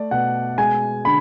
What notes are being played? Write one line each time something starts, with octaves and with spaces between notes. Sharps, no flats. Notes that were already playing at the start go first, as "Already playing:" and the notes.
Already playing: A3 D5
B2 F#5
G#3 G#5
D3 B5